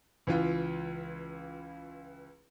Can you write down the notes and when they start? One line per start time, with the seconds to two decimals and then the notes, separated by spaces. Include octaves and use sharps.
0.27 C#2 E3 F4